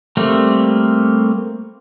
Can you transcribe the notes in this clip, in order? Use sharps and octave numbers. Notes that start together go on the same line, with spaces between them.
G3 A3 A#3 C4